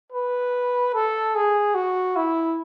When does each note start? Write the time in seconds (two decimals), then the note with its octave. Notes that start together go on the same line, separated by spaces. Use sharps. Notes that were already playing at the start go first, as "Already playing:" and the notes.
0.12 B4
0.94 A4
1.35 G#4
1.75 F#4
2.16 E4